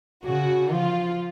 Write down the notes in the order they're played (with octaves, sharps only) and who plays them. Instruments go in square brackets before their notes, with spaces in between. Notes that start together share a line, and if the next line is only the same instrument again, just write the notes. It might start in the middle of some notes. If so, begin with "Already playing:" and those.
[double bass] C#3 [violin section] F#4
[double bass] F3 [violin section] F4